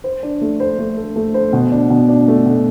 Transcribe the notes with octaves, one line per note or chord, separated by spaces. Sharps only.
C5
D4
A3
C5
A3
A4
A3
C5
B2
D4
B2
D4
A3
B2